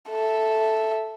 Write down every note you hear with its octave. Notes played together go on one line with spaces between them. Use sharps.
A4 E5